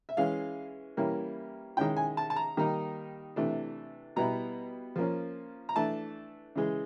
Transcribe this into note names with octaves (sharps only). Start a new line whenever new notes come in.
E5
E3 G#3 C#4 F5
E3 G3 A#3 C#4 E4
D#3 G#3 C#4 E4 G5
G#5
A5
A5
A#5
D#3 G3 A#3 D#4
C3 E3 A3 D4
B2 G3 B3 E4 A#5
F3 A#3 C#4
A#5
E3 A3 D4 A5
C#3 E3 G#3